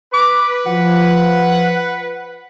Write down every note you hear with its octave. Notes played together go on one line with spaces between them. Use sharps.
B4 D6
F3 F#5